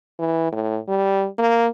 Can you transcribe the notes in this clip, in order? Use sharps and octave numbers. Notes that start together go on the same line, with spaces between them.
E3
A2
G3
A#3